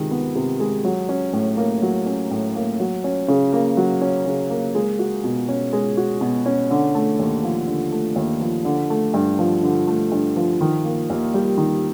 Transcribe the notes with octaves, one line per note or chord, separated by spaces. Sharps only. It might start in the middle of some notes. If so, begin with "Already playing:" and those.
Already playing: C3 D#3 G#3
B3
C3
G#3
F#3
C#4
A2
A#3
F#3
C#4
A2
A#3
F#3
C#4
C#3
A#3
F#3
C#4
C#3
A#3
G#3
F#4
B2
C#4
G#3
F#4
B2
C#4
D3
A3
D#2
F3
D3
A3
D#2
F3
D3
A3
G2
F3
D3
A3
G2
F3
D#3
A#3
D#2
G3
D#3